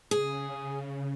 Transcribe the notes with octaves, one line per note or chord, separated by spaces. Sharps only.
C#3 G#4